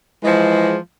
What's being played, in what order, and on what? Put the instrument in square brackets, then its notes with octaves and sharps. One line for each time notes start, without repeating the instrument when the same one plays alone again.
[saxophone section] E3 F3 G#3